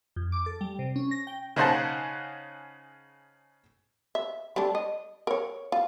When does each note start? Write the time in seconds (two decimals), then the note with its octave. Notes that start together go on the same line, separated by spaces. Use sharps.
0.16 F2
0.32 D6
0.46 A4
0.61 G3
0.79 C3
0.96 C#4
1.11 A#6
1.27 G5
1.56 C#3 D#4 G#4 C5 F#5 A5
4.15 E5
4.56 G3 A3 D4
4.75 D#5
5.27 A#4 C#5
5.72 F4